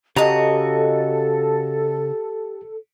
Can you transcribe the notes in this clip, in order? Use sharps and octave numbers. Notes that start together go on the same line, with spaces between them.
C#3 F#4 G4 A4 D#5 A5 A#5